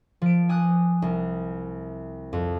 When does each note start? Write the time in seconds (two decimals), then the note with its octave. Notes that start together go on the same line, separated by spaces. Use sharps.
0.22 F3 D7
0.49 G#5 D#6 F#6
1.02 C2
2.33 F2